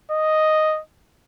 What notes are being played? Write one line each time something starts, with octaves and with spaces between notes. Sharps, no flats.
D#5